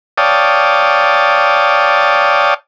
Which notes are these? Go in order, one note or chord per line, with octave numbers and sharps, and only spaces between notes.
C#5 D5 F5 G5 A5 D#6